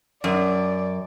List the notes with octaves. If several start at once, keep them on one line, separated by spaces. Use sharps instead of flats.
F#2 D5